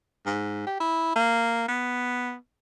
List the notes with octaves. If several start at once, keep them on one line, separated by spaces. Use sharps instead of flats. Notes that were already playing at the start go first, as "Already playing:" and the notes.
G#2
G4
E4
A#3
B3